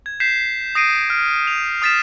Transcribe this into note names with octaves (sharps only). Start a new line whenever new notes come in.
G#6
G6 B6 C7 E7
D#6 A#6 C7 D7 D#7
F6 D7
F7
D#6 F6 A6 B6 E7